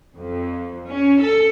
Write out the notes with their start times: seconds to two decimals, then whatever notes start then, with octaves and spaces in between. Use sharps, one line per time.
0.16 F2
0.90 C#4
1.20 A4